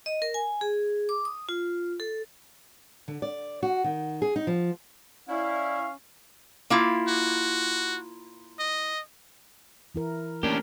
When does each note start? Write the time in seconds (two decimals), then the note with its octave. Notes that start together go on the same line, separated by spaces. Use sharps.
0.06 D#5
0.22 A#4
0.34 G#5
0.61 G#4
1.09 D6
1.25 D#6
1.49 F4
2.00 A4
3.08 D3
3.22 D5
3.63 F#4
3.84 D#3
4.22 G#4
4.36 D#4
4.47 F3
5.29 C#4 E4 D5 F5
6.70 A#3 E4 F4
7.08 F#4
8.59 D#5
9.95 E3 E4 A#4
10.43 A3 A#3 C#4 D4 G4 A#4